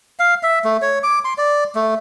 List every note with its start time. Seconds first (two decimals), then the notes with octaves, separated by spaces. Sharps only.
0.19 F5
0.43 E5
0.64 A3
0.82 C#5
1.03 D6
1.24 C6
1.38 D5
1.75 A3